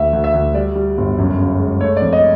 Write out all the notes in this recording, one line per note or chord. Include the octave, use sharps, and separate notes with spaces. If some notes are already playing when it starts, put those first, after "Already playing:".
Already playing: D2 E5
D2
E5
D2
G3 D5
G3
G1
F#2
C#3
G#3
A3 C#5
D5
F2
D#5